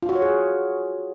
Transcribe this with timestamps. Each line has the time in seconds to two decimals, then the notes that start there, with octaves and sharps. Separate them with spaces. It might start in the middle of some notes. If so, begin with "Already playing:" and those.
0.03 F4
0.09 F#4
0.15 C#5
0.22 G#4